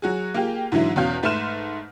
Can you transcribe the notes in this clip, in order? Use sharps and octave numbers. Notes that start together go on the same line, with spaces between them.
F#3 F#4 G#4
A#3 F4 G4 G#4
G#2 D3 E3 F#3 E4
E2 B2 C#4 F5 G6
G#2 A3 B4 C6 F6 E7